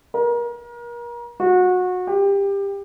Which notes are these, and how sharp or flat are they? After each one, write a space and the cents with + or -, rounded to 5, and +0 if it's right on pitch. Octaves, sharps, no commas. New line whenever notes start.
A#4 +35
F#4 -25
G4 +20